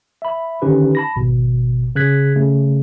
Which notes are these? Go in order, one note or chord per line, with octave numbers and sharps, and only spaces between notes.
E5 B5
D3 D#3 C#4 D#4 G4 B4
A5 B5 A#6
G#1 B2
C#3 G#4 F#6 G#6 B6
C#3 A3